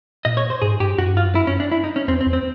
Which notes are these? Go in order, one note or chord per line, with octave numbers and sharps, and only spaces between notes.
A#2 D#5
C#5
C5
G#2 G#4
G2 G4
F#2 F#4
G2 F4
F#2
E4
C#4
D4
E4
D#4
C#4
E2 C4
C4
E2
C4